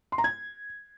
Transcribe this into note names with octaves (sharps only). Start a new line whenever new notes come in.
C6
A#5
G#6